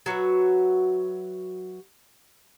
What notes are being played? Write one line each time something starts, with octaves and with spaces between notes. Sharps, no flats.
F#3 F#4 B4 E5